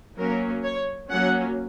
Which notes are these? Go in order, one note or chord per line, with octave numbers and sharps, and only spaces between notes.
F#3 A#3 C#4 A#4
C#5
F#3 A#3 C#4 F#5